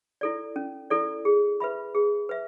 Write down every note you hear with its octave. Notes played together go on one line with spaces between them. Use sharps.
E4 A4 D5
C#4
E4 A4 D5
G#4
B4 E5 B5
G#4
B4 E5